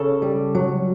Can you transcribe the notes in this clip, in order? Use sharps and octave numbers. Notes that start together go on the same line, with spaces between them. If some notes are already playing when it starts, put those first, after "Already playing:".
Already playing: C#3 A4
G3
F#3